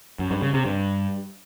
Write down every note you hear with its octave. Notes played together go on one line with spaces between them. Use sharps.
F#2
G2
C#3
C3
G2